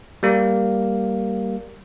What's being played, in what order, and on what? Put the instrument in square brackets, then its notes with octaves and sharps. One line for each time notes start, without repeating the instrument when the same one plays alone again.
[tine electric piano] G3 A#3